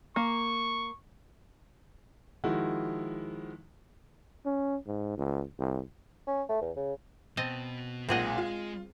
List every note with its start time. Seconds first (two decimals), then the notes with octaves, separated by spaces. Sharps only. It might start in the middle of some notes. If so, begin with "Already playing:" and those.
0.16 A#3 C#6
2.44 D#3 F3 G#3 E4 F#4
4.45 C#4
4.86 G#2
5.18 C#2
5.59 C2
6.27 C#4
6.49 A3
6.61 E2
6.76 C#3
7.37 B2 C4 D#5 A5
8.09 B1 A#2 G#3 C4 G#4 D#5 F#5
8.38 F4